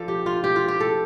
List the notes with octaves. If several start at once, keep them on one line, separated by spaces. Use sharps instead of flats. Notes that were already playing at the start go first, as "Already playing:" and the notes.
Already playing: F3 D4 F4 A4
G4
F4
G4
F4
G4
A4